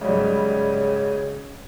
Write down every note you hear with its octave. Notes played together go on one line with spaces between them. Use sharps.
G#2 C#3 F#3 G3